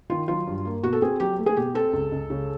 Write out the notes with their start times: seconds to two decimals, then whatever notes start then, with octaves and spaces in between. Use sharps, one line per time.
0.10 D#3 F4
0.28 F#3 F4
0.47 G2
0.65 A#3
0.83 B2 F#4
0.93 A4
1.02 C4 G#4
1.20 F#3 G4
1.39 A3
1.46 G#4
1.57 B2 G4
1.74 C4 A4
1.93 C#2
2.12 C#2
2.30 C#3